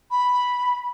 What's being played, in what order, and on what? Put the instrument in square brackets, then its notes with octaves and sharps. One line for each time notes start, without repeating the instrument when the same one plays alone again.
[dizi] B5